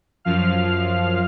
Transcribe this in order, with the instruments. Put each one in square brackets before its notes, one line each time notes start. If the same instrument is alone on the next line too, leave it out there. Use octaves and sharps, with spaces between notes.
[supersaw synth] F#2 F3 F5 F6